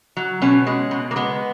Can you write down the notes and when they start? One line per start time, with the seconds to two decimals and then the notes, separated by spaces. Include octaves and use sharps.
0.17 F#3
0.42 B2 C#4
0.67 G#3
0.91 B2
1.11 A#3
1.16 G#3 B3